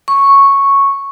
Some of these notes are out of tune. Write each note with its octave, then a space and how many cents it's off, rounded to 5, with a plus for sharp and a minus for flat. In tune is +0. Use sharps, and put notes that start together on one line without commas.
C#6 -5